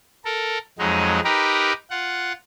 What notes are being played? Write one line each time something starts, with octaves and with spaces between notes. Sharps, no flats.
A4 A#4
F2 F#3 G#3 D#4
D#4 G4 A#4 B4
F4 F#5